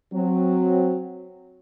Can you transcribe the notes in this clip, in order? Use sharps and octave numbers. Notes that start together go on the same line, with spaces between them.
F#3 C4